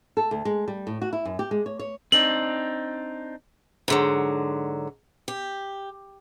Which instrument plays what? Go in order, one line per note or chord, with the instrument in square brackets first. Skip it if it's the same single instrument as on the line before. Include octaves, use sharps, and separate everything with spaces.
[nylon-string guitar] A4
D2
G#3
G3
A2
F#4
E4
F#2
G4
G#3
C#5
C#5
[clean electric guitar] C4 D4 D#4 [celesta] F#7
[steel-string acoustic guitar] G#2 D3 F#3
G4